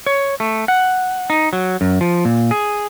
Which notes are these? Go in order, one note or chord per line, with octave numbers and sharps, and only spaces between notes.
C#5
A3
F#5
D#4
F#3
F#2
F3
A#2
G#4